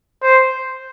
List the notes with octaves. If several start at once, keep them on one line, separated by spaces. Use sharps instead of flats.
C5